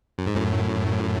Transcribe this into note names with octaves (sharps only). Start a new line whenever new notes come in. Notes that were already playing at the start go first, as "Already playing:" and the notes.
F#2
G#2
F#2 A2